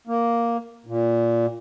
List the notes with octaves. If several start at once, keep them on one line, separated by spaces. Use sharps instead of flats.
A#3
A#2